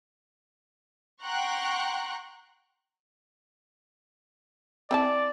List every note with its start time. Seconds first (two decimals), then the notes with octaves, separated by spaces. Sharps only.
1.22 F#5 G5 A#5 C6 C#6 F#6
4.91 C4 E4 D5 A5